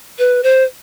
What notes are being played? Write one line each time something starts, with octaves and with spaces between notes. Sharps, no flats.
B4
C5